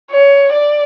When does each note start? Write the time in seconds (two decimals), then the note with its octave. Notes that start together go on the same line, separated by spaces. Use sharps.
0.11 C#5
0.52 D5